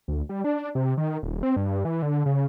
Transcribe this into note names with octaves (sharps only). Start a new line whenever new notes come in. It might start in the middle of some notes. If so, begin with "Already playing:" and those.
D2
G3
D4
C3
D#3
D#1
C4
G2
E3
D3
C#3